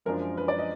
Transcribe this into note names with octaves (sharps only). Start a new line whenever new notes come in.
F#2 F3 G#3 D4 A#4
B4
D5
D#5